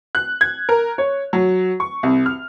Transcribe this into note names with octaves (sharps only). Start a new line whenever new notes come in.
F#6
G#6
A#4
C#5
F#3
C#6
C2
F6